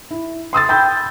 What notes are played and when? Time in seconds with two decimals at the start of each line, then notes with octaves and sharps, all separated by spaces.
0.11 E4
0.53 C6 D#6 E6 A6
0.69 G5 B5 G6